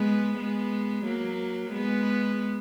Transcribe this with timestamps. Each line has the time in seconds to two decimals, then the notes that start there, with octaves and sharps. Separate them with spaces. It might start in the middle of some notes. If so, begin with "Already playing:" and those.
Already playing: G#3 B3
0.37 G#3 B3
1.05 F#3 A#3
1.72 G#3 B3